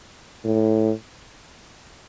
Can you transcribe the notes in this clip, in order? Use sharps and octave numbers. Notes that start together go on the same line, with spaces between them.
A2